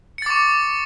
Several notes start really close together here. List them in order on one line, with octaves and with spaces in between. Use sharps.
C#7 A6 D6 C#6